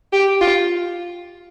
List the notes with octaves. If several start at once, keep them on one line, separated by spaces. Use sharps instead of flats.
G4
F4